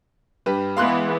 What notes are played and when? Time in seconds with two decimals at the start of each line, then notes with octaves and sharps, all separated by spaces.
0.46 G2 G4 B4
0.77 E3 G#3 B3 F5 C6 F#6